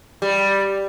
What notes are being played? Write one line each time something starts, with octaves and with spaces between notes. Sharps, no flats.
G3